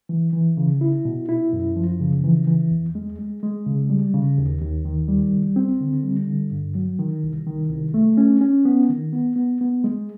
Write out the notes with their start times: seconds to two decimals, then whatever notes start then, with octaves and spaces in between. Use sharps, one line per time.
0.09 E3
0.33 E3
0.57 C#3
0.81 E4
1.05 B2
1.29 E4
1.53 F#2
1.76 F3
2.00 C#3
2.24 E3
2.47 E3
2.71 E2
2.95 G#3
3.19 G#3
3.43 G#3
3.67 C#3
3.90 G3
4.14 C#3
4.38 D#2
4.61 D#2
4.85 D#3
5.08 G3
5.32 C2
5.56 C4
5.81 D3
6.04 G3
6.27 D3
6.52 G2
6.75 F#3
6.99 D#3
7.23 C2
7.46 D#3
7.70 C2
7.94 A3
8.18 C#4
8.41 C#4
8.65 B3
8.90 D#3
9.13 B3
9.36 B3
9.61 B3
9.84 G#3